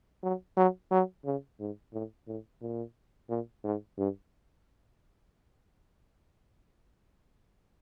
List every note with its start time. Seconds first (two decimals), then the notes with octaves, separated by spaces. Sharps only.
0.23 F#3
0.57 F#3
0.91 F#3
1.25 C#3
1.59 G#2
1.93 A2
2.27 A2
2.62 A#2
3.29 A#2
3.64 G#2
3.98 G2